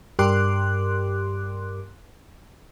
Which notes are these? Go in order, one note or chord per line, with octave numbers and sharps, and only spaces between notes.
G2 G4 A#4 C6 D6 F#6